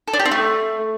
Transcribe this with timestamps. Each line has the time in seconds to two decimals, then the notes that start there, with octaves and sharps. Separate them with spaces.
0.08 A4
0.13 D4
0.19 G4
0.25 C4
0.31 A3